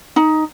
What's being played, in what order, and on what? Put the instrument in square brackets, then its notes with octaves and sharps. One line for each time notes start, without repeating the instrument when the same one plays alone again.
[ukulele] D#4